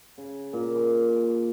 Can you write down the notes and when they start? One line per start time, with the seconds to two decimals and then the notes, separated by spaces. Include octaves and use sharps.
0.18 C#3
0.53 A#2
0.76 D6
1.16 D6